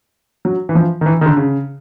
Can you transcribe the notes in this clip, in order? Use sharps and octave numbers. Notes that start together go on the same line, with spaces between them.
F#3
E3
F3
D#3
E3
D#3
D3
C#3